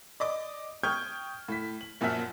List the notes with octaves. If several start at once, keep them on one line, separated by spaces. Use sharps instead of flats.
D5 D#5 D6
G5 C#6 D#6 F6 G6 G#6
A2 B6
F#7
F#2 A#2 F3 F#4 E5 F6